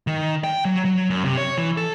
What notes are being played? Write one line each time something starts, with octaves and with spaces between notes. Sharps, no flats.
D#3
G5
F#3
F#3
F#2
C3
C#5
E3
A4